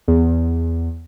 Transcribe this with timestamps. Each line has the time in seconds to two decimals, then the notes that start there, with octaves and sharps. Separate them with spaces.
0.08 E2